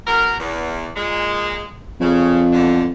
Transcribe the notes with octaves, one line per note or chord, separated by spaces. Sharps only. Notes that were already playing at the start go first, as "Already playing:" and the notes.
E2 F#3 A#4
E2
A#2 G#3
F2 C#3
E2 D3